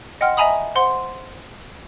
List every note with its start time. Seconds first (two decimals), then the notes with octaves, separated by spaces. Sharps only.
0.21 D#5 F#5 G5 C6 F6
0.37 D#5 E5 G#5 A#5 B5 D#6
0.75 C5 F#5 C6